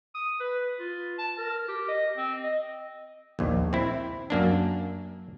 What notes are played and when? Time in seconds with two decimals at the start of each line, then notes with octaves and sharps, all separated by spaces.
0.15 D#6
0.40 B4
0.79 F4
1.19 A5
1.38 A#4
1.68 G4
1.88 D#5
2.17 C4
2.44 D#5
3.39 A#1 D#2
3.73 C4 E4
4.30 F#2 A#3 D4